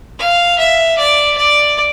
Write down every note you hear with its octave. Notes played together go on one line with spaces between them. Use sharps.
F5
E5
D5
D5